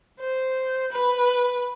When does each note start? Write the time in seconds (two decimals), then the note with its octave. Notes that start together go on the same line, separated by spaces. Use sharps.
0.20 C5
0.93 B4